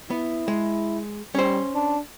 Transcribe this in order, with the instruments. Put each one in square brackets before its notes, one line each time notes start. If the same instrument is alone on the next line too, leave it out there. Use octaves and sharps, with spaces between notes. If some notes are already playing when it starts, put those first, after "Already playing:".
[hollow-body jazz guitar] B3 [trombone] E4
[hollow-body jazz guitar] G#3
[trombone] G3 [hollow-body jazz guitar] C#4 C5
[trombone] D4